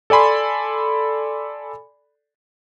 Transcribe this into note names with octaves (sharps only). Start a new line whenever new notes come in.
A4 D5 G#5 B5 C6